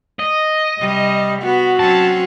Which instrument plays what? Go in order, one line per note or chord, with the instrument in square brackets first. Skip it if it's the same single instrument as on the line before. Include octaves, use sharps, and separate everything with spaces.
[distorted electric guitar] D#5
[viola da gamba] C3 G3
[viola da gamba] B3 [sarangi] F#4
[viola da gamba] F#3 C4 C#4 [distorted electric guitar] A5